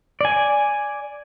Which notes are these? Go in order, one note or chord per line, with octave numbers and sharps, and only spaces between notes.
D5 G#5